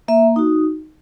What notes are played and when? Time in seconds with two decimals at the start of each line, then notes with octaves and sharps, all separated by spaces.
0.08 A#3 E5
0.36 D#4 F#4